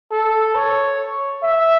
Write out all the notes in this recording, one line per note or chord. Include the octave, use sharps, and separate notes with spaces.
A4
C#5
E5